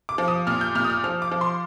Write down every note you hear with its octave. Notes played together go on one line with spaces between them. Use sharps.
D6
F3
D#6
A#2 F6
G6
A#2 F6
D#6
F6
F3 F6
D6
F3
C6